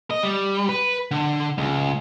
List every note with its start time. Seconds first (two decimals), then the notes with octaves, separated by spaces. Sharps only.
0.10 D#5
0.23 G3
0.69 B4
1.11 D3
1.58 C#2